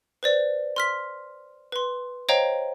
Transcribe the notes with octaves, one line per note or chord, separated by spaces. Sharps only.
B4 C5 D5
C6 F6 B6
B4 C6
C5 C#5 D#5 F5 G5 A#5